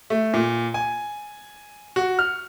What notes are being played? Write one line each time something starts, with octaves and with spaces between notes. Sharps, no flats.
A3
A#2
G#5
F#4
F6